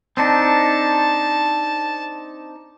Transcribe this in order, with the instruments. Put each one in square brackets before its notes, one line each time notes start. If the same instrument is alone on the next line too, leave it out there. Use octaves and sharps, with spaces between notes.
[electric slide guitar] C4 D4 D#4 [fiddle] A5